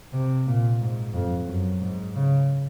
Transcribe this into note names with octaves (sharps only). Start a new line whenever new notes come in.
C3
A#2
G#2
F2
F#2
G#2
C#3